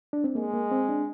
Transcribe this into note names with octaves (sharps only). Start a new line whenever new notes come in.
D4
C4
G#3 A#3
A#3
C4
D4